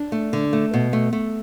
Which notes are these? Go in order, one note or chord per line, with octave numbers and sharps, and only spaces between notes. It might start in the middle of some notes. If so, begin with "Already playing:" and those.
Already playing: D4
A3
D3
A3
B2
A3
A3